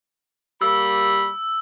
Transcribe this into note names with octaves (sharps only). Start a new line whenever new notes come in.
G3 A#3 B5 E6